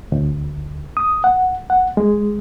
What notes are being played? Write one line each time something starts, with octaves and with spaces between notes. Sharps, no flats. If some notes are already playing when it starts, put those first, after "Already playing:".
D2
D#6
F#5
F#5
G#3